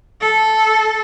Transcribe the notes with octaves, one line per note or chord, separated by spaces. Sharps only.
A4